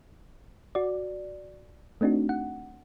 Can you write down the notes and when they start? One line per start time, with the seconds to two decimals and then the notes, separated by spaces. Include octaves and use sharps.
0.75 F#4 D5
2.01 A3 C4 D4 D#4 F#4
2.29 F#5